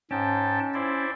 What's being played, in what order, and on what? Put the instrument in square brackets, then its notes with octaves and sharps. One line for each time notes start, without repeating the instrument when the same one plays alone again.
[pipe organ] G#2 G5 A5 [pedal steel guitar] C#4
[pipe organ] E4 C5 D5